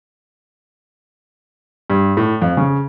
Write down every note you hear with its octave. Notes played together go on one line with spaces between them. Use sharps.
G2
A2
F2
C#3